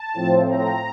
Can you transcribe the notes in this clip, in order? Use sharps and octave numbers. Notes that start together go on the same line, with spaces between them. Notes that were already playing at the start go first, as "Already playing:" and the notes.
Already playing: A5
A2 F3 C4
A#5